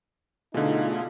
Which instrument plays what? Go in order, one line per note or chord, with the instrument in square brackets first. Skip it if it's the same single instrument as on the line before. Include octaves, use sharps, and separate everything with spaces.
[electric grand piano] B2 D3 [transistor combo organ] A3 F4 G#4 [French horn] D#4